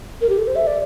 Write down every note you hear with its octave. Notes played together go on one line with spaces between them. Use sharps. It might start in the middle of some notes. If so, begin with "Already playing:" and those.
A#4
G4
A4
C5
E5
D5